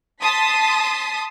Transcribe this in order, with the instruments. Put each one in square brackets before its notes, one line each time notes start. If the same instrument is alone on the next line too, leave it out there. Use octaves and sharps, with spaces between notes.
[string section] A5 C6 D#6 B6